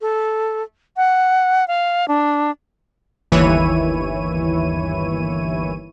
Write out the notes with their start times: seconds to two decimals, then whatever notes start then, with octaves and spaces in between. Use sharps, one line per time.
0.01 A4
0.97 F#5
1.68 F5
2.08 D4
3.32 G1 D#2 E3 E4 C#5 D#7